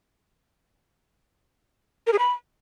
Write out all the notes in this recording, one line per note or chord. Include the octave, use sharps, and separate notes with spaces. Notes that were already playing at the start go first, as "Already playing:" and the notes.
A#4
G#4
B5